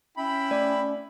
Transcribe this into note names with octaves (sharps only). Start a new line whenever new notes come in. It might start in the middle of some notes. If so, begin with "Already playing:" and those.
C#4 E4 G5 B5
A3 D5